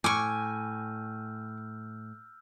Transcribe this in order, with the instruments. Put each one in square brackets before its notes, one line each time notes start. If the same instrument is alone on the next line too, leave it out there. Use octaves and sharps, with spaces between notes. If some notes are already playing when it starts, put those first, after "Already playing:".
[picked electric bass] A2 [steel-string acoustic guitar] G#5 [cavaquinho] C#6 D6 [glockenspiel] E6 F6 G6